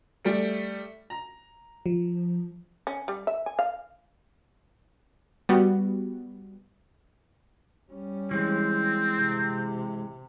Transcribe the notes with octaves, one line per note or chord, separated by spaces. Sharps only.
G3 A3 D7
A#5
F3
C#4
G3
E5
G#5
F5
G3 B3 F#4
G3 C#4
E3 G#3 C4
C3